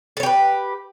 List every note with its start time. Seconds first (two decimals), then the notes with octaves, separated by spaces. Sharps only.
0.17 A4
0.20 C#5
0.23 G4
0.26 B4